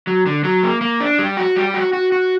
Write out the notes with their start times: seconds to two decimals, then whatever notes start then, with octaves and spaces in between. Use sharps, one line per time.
0.07 F#3
0.26 D3
0.44 F#3
0.63 A#3
0.81 A#3
1.00 D4
1.19 G3
1.37 F#4
1.56 G3
1.74 F#4
1.93 F#4
2.12 F#4